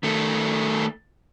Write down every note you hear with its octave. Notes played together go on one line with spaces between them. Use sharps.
D#3 A3